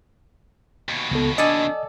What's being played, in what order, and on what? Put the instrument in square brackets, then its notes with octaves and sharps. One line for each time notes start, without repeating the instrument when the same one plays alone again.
[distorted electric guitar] D#2 B2
[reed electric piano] C#2 A4 [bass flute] B3
[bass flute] D4 [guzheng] A4 D5 G#5 [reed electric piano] D#5